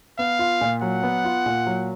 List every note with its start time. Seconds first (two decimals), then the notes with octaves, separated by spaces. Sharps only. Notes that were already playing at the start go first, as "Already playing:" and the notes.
0.18 B3 F5
0.39 F4
0.61 A#2
0.82 F#3 F#5
1.03 B3
1.25 F4
1.46 A#2
1.67 F#3